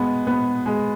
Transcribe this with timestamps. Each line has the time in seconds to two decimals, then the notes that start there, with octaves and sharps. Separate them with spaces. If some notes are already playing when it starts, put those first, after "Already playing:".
Already playing: G#3 B3
0.27 B3
0.66 G#3